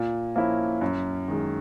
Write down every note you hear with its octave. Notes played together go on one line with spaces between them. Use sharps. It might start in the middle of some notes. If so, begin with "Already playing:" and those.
Already playing: A#2
F3 A#3 C#4 E4
F#2
D#3 G#3